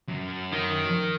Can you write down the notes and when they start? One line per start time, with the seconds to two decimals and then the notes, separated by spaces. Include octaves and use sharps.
0.08 F#2
0.53 D#3